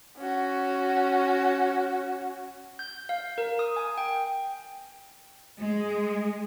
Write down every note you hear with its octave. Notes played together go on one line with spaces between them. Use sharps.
C#4 F#4
G6
F5
A#4
D#6
G#5
G5
G#3